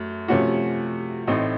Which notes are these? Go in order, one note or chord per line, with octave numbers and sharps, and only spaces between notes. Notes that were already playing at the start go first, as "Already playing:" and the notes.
Already playing: F#2 A3
C3 F3 A3 C#4 F#4
A1 A2 A3 C4 D#4